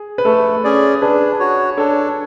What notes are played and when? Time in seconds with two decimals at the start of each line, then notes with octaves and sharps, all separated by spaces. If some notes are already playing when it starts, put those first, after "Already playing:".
Already playing: G#4
0.18 B4
0.25 A3 A4
0.64 C#4 G#4 D5
1.02 D4 G#4 B4
1.40 F#4 C#5
1.77 D4 A4 C#5